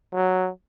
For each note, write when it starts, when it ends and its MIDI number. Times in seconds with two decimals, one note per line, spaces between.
0.13 0.50 54